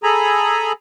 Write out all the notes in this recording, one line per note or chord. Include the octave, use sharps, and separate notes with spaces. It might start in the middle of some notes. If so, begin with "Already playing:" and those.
G#4 A4 G#5 A#5 B5